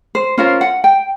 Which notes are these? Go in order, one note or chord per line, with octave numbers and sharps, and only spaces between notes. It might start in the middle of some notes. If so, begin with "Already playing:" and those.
C5
C#4 F4 A#4 C5
F#5
G5